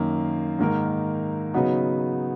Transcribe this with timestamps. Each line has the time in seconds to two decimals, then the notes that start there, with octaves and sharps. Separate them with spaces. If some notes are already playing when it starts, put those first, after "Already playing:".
Already playing: F#2 D#3 A#3
0.59 G#2 D#3 A#3 D#4 A#4
1.54 C#3 F#3 B3 D#4 F#4